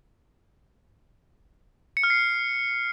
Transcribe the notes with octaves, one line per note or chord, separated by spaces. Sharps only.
C#7
F6
C7